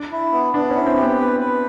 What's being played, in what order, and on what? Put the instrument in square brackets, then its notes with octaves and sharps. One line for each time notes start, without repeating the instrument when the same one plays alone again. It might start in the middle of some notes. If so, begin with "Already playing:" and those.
Already playing: [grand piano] D4
[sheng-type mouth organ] E4
B3
[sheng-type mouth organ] B3 [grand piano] D4
[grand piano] C#4
[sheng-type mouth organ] E4
[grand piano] C4
[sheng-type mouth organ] G4
[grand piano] B3
[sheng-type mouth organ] B4
B4